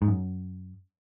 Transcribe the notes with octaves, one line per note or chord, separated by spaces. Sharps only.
G#2
F#2